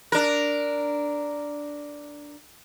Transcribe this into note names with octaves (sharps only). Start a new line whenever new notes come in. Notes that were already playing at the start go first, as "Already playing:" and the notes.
D4 A#4